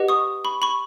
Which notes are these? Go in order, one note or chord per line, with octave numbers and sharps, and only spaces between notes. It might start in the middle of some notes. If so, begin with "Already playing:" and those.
Already playing: G4 B4 D#5 F#5
C#6 D#6
B5 C#6
B5 C#6